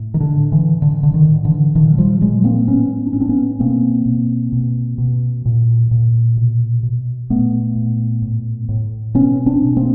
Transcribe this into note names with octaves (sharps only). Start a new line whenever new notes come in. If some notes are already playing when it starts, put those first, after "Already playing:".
Already playing: A2
D#3
D3
A2
D3 E3
A2 D3
D3
D#3
A2
D3 E3
A#2 D#3 F3
F#3
F3 G3
A#2 F#3 G#3
A#3 C4
A2 B3 C#4
D4
A2 C#4
C4 D4
B3 C#4
B2 A#3 C4
B2
B2
B2
A#2
A#2
B2
B2
A#2 A3 B3
A#2
A2
A2
B2 B3 C#4
C4 D4
B2
A#3 C4